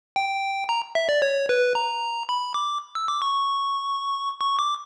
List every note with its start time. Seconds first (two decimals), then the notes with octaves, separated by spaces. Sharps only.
0.16 G5
0.69 A#5
0.95 E5
1.09 D5
1.22 C#5
1.49 B4
1.75 A#5
2.29 B5
2.54 D6
2.95 E6
3.08 D6
3.22 C#6
4.41 C#6
4.59 D6